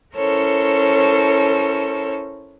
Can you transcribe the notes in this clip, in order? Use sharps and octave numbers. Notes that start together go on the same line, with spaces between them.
C#4 E4 A4 A#4 C5 C#5